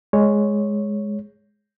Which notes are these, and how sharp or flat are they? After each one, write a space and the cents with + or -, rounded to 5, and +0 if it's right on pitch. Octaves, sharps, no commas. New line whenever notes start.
G#3 +0 C#5 +0